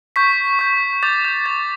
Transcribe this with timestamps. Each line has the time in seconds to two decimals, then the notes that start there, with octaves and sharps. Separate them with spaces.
0.16 C#6 G6 B6
0.59 C#6 G6
1.03 D6 G6 A6
1.25 G6
1.46 C#6 G6 A6